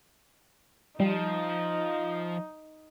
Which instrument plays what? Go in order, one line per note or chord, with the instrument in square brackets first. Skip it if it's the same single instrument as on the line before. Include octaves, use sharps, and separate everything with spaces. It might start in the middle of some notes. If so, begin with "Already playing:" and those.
[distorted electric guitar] F3 [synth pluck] G3 [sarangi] D#4